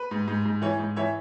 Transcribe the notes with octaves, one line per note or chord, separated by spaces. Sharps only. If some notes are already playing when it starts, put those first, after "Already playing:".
Already playing: B4
G#2
G#2
G#2
E3 C#5
G#2
E3 C#5 E5